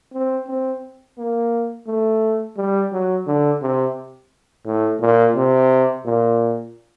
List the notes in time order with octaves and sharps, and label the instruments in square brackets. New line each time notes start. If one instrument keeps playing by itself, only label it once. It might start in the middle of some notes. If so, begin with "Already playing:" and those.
[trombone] C4
C4
A#3
A3
G3
F#3
D3
C3
A2
A#2
C3
A#2